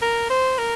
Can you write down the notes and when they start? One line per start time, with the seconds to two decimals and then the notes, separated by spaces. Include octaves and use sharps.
0.02 A#4
0.30 C5
0.58 A#4